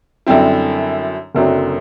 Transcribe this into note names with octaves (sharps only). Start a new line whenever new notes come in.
F#2 D3 G3 C4 E4
F#1 F#2 D3 F#3 C4